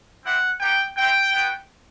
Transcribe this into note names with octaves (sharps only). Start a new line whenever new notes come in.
C4 E4 G4 F#5
B3 D#4 G4 G5
C4 E4 G4 G5
B3 F#4